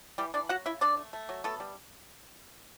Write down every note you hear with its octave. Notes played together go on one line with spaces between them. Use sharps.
E3 G3 G4
E3 D4 D5
F#3 F#4 F#5
C#3 E4 E5
D3 D4 D5
A3
A3
F#3
A3 B3 A4
G3